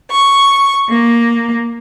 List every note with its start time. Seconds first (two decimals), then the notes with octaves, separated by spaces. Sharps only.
0.11 C#6
0.89 A#3